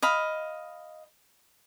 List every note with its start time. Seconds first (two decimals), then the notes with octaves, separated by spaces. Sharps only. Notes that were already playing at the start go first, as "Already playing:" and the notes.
0.02 D#5 F5 B5